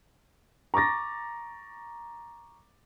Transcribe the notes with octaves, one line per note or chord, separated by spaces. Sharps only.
A#5 C#6 D6 A6 A#6